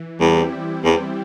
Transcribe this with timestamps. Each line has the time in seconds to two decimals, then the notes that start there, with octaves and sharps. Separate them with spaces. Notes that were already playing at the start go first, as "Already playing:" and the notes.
Already playing: E3
0.20 E2 G3 C4 E4 G4
0.52 E3
0.84 E2 G3 C4 E4 G4